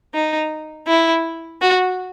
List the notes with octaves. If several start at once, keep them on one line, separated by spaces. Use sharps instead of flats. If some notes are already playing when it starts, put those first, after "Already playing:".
D#4
E4
F#4